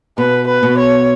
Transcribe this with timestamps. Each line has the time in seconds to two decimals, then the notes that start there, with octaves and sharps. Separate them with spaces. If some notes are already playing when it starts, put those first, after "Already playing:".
0.18 B2 B4
0.47 B4
0.63 B2
0.78 C#5